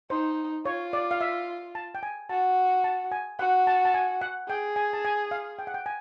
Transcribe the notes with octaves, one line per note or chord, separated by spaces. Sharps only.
D#4 C5
F4 C#5
D5
F5
E5
A5
G5
G#5
F#4 A5
A5
G#5
F#4 F#5
A5
A5
G#5
F#5
G#4 G5
G#5
A5
G#5
F5
G5
F#5
G5
G#5